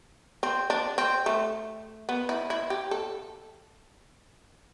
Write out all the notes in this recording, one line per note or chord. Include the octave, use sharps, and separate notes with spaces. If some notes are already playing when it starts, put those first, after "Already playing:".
C4
D4
C4
A3
B3
E4
E4
G4
A4